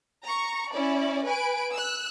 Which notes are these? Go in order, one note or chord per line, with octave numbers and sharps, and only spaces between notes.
A#5 C#6
C#4 E4 D5
B4 G#5 D7
E6 F#6